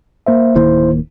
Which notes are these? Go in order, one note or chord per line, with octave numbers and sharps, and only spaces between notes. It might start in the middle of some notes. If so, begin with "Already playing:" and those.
A#3 C5 E5
D1 D#3 A#3 E4 C5